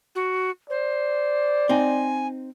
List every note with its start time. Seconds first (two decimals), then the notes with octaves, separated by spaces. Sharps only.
0.15 F#4
0.70 C5 D5
1.69 C4 D#4 G#5